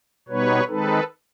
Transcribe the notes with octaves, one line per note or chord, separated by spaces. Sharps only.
B2 G3 B3 D#4 B4 C#5
D#3 G#3 C4 D#4 A4 B4